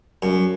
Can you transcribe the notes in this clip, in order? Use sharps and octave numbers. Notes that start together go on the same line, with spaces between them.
F#2